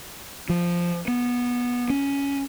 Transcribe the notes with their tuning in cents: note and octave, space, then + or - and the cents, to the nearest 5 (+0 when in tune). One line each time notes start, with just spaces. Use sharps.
F3 -5
B3 -15
C#4 +10